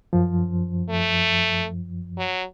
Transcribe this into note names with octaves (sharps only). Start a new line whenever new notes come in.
F#2 F3
A3
F#3